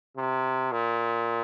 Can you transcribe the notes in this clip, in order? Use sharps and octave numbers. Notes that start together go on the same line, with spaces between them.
C3
A#2